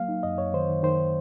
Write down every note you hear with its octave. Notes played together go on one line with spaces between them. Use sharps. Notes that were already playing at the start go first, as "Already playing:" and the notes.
Already playing: F#3 A#3 F5
D#4
F#2 D#5
F#2 C#5
D#3 C5
D#3
D#3 C5